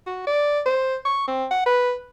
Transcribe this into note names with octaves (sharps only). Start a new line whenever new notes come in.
F#4
D5
C5
C#6
C4
F#5
B4